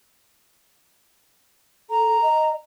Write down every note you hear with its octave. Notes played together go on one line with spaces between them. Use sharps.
A4 A#5
D#5